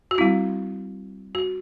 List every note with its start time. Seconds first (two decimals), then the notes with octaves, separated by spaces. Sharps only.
0.11 F#4
0.18 G3 C4 E4
1.35 F#4